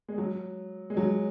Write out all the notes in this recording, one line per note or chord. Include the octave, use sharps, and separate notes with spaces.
G#3
F#3
G#3
F#3